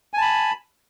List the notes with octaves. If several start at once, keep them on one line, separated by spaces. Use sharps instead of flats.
G#5 A5 B5